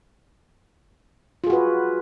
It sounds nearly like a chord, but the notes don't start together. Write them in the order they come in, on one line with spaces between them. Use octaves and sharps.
F4 G#4 F#4 B4